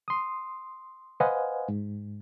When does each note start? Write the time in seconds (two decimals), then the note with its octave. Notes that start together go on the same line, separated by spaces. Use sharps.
0.08 C6 D#6
1.20 B4 C5 D#5 F5 F#5 G#5
1.68 G#2